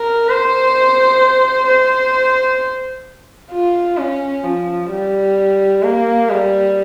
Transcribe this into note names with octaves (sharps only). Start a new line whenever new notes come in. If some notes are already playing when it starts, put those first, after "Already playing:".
Already playing: A#4
C5
C5
F4
C#4
F3
G3
A#3
G3